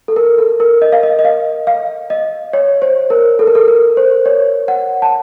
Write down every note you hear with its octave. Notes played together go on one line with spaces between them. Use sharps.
A4
A#4
A4
A#4
D#5
F5
D#5
D#5
F5
F5
D#5
C#5
C5
A#4
A4
A#4
A4
A#4
C5
C#5
F#5
A5